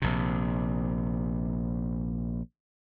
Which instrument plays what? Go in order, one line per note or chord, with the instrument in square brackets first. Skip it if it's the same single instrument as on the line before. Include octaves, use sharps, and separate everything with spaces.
[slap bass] A#1 C3